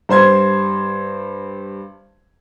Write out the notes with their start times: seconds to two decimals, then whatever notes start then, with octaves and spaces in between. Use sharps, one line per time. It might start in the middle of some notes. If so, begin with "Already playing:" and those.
0.09 G2 C5 C6 G#6